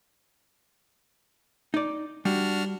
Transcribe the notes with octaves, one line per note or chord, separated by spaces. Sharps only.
D#4 D5
G3 D4 F#4 F6